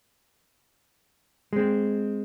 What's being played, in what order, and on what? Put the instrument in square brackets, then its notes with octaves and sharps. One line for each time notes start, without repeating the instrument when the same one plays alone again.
[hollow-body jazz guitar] G#3 C4